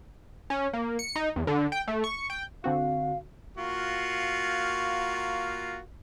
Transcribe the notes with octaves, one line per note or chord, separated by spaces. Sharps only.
C#4
A#3
C#7
D#4
E2
D3
G5
A3
C#6
G5
D3 C4 F#4 F5
A#3 F4 F#4